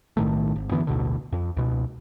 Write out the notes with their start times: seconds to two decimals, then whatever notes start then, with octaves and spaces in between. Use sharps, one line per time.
0.17 B1 A2 D#3 A3
0.56 G#1
0.71 F#2 D3 E3 B3
0.87 A1 D2 B2 D3
1.32 F2
1.57 C#2 B2